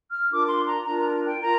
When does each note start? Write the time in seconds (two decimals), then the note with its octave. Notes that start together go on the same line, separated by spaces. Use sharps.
0.11 F6
0.30 D4 F4 A#4 D6
0.48 C6
0.66 A#5
0.85 D4 F4 A#4 A#5
0.99 A#5
1.27 G5
1.41 F4 A#4 A#5